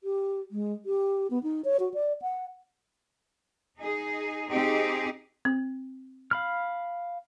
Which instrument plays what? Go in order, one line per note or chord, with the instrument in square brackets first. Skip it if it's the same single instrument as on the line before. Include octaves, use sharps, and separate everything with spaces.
[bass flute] G4
G#3
G4
B3
D#4
C#5
F#4
D5
F#5
[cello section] D#4 G#4
C4 D#4 G4 G#4
[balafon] C4
[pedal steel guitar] F5 B5 F6